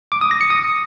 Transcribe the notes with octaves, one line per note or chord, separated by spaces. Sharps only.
D6
D#6
A#6
C#7
D#6